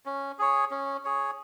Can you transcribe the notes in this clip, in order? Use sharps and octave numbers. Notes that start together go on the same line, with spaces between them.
C#4
G#4 C#5
C#4
G#4 C#5